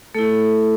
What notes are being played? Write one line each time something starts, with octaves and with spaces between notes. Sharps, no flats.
A3 E4 A4